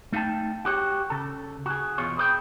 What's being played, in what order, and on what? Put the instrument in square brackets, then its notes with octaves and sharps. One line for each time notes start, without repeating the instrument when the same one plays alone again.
[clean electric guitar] A3 D#4 F5 G5 A5
F#4 G4 C#5
C#3 A4
F#4 G#4
E2 B2 F4 C#5
G#4 B4 D5 G5